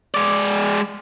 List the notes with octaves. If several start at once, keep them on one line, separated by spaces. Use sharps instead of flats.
G#3 D5